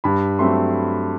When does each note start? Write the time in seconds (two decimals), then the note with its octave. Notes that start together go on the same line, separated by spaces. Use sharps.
0.04 G2 B5
0.39 F#3 A3 C4 C6